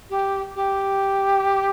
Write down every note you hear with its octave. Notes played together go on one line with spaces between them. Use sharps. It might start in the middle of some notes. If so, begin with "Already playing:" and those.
G4
G4